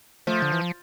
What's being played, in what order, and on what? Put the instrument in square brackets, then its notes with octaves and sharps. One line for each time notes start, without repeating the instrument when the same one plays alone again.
[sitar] F3 [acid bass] A3
[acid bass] D3
E3
F3